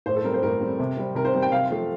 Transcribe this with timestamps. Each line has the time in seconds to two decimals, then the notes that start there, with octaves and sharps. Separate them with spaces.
0.06 A2 C5
0.16 A4
0.24 G3 C4 A#4
0.34 C5
0.43 A2 A#4
0.61 G3 C4
0.80 C3
0.97 G3 C4
1.15 C3 A#4
1.25 C5
1.34 G3 C4
1.42 G5
1.52 C3 F5
1.70 F3 A3 C4